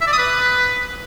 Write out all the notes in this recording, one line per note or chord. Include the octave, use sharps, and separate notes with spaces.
E5
D5
D#6
B4